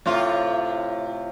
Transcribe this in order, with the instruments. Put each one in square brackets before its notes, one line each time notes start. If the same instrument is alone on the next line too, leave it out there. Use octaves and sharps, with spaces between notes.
[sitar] A2 C3 F4